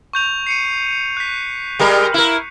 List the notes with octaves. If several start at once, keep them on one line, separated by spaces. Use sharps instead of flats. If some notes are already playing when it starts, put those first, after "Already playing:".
C#6 G6 F7
C7 C#7 D#7
F#6 B6
G3 G#3 A#4
E4 A#4